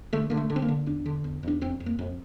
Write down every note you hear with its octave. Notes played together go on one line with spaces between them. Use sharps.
D3 A3
D3 A#3
A3
D3
C4
A#3
D3
E2 D4
D3
E2
E2 D4
F2 C4
F2
A#3
F2